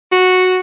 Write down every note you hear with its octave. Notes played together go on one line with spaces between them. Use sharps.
F#4